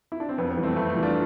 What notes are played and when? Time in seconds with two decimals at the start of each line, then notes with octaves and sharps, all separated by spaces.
0.12 E4
0.20 D4
0.29 C4
0.38 F2 B3
0.51 B3
0.57 E3 G3
0.63 A3 C4
0.76 F2 A3
0.90 A3
0.97 E3 G3
1.03 D4 F4